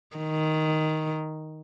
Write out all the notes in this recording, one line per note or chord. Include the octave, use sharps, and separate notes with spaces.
D#3